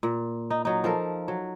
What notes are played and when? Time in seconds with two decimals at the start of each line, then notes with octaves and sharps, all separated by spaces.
0.03 A#2
0.50 D#4
0.65 F#3 D#4
0.84 F3 A4 A#4
1.28 F#3